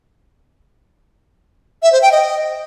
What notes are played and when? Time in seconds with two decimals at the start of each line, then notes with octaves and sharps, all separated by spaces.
1.83 E5
1.92 C5
2.02 G5
2.12 D#5